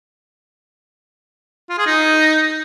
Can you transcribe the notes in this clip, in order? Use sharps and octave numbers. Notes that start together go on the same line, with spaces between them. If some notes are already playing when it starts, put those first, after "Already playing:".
F4
G#4
D#4